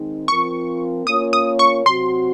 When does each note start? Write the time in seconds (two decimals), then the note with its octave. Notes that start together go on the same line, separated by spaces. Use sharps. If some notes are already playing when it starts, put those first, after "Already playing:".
Already playing: D#3 G#3 C4 D#4
0.28 F3 C4 F4 A#4 C#6
1.07 A#3 C#4 F4 A#4 C#5 D#6
1.33 D#6
1.59 C#6
1.85 C3 F#3 C4 F#4 C5 C6